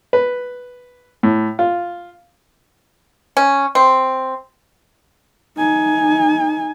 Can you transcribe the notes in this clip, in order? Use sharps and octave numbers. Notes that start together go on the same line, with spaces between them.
B4
A2
F4
C#4
C4
D#4 G#5